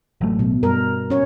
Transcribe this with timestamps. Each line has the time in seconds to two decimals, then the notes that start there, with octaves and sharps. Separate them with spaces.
0.21 A1 F#3 A3
0.39 B2
0.63 G2 A#4
1.10 C#4 C#5